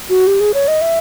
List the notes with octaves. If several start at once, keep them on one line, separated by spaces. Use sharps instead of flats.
F#4
G4
G#4
C#5
D#5
E5